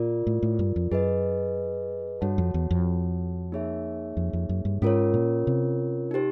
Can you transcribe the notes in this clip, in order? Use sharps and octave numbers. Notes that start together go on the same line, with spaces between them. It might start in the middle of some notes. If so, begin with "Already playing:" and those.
Already playing: A#2 F4 A#4 D5
A2
A2
G2
F2
F#2 G#4 B4 D#5
G2 F#4 A4 C#5 F#5 A5
F2
E2
F2
A#3 D#4 G#4 C#5 E5
F2
F2
F#2
G2
G#2 C#4 F4 A#4 C#5
A#2
C3
D#4 G4 C5